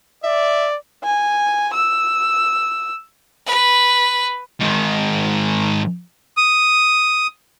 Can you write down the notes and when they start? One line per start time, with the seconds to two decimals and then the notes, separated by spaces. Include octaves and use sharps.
0.24 D5 E5
1.03 G#5
1.74 E6
3.47 B4
4.60 G#2 D#3
6.37 D#6